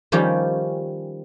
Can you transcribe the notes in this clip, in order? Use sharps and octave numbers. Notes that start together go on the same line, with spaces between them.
D#3 F3 G3 C#4 G4